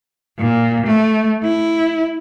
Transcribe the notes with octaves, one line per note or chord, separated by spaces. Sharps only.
A#2
A3
E4